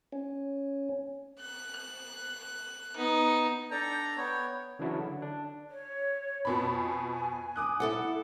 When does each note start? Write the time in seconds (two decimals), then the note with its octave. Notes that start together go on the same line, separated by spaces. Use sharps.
0.13 C#4
1.40 F#6
2.96 B3 D#4
3.71 D4 A4 G5 A#5
4.17 B3 C#5
4.79 C#3 E3 F#3 D4 E4 F#4
4.97 D3
5.22 D4
5.70 C#5
6.45 F2 B2 G#5 B5
7.56 D6 D#6 F#6
7.80 E4 A4 F#5